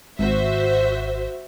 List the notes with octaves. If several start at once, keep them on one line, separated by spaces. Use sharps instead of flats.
G#1 F#4 C5 E5